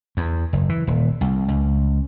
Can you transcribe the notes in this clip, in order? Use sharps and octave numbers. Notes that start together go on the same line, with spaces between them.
E2
F#1
E3
D#1
C2
C#2